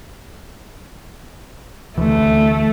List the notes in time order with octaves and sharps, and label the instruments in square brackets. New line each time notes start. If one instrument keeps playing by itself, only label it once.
[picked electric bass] D2 E3 [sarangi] A3